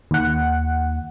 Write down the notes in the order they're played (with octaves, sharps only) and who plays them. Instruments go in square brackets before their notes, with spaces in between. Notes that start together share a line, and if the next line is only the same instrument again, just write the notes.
[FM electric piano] D#2 F#5